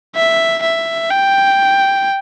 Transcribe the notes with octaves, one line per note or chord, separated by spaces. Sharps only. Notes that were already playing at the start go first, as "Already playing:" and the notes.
E5
E5
G5